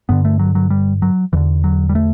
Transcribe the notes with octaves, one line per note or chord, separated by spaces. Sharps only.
G2 D3 B3
A3
F#3
F#3
G3
F#3
E2 D3 E3
F#3
G3
A3